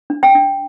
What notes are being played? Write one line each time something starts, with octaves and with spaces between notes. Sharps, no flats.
D4
G5
D4